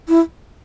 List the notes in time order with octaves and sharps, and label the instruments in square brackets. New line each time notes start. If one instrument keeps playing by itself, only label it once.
[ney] E4